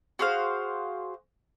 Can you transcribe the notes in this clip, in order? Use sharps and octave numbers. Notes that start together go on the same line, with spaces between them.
F#4 G#4 C5 F5